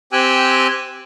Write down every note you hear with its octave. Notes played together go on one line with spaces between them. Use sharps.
C4 G4 G5 G#5 E6 F#6